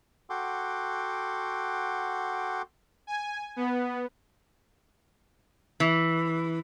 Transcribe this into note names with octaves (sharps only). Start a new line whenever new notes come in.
F#4 A4 F#5 G5 C6 D6
G#5
B3
E3